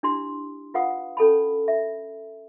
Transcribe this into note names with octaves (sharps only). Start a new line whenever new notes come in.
D4 E4 G4 C6
F4 B4 F5 F#5 D#6
C#4 A4 A5 B5
E5